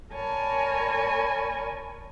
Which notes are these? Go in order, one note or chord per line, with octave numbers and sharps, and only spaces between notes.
A#4 C#5 D5 G#5 A5 B5